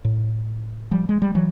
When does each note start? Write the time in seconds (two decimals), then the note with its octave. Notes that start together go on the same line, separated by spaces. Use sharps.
0.05 A2
0.91 F3 G3
1.09 G#3
1.22 G3
1.35 E3 F#3